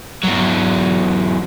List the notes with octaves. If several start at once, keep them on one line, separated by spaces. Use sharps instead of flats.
E2 F#3